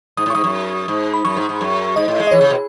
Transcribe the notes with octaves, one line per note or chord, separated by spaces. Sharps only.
G#2 D#6
A2
C#6
G#2 D#6
F#2
G#2
B5
F#2 C#6
G#2
G#2
F#2
G#2 D#5
A2
G#3
D#5
E3 C#5
C#3
B2